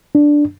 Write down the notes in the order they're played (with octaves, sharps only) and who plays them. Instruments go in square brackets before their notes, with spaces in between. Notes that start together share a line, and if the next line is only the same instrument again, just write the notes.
[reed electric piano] D4